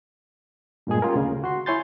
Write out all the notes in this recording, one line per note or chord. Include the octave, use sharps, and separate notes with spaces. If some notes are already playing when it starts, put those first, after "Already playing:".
G2 A#2 G#3 G#4
A#3 C#4 F4 G4 A#4
D2 C#3
F#4 C6
E4 C#5 G#5 C6 G6 A6